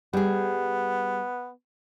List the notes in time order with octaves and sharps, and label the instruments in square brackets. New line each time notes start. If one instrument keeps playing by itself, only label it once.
[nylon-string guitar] G3 G#4 [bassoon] B3